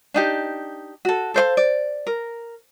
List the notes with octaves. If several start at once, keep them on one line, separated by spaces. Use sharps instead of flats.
D4 D#4 G4
F#4 A4
A4 C5 C#5 F5
D5
A#4